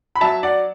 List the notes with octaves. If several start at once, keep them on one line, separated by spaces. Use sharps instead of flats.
B5
F#3 E5 A5
D5 F#5